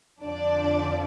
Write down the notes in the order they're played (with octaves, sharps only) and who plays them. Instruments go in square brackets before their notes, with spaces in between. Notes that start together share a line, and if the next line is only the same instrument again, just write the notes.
[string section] F2 D3 F3 D4 D5